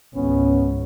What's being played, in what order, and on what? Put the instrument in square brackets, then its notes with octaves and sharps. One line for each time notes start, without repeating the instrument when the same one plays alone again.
[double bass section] G#1 C#2 [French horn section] B3 C#4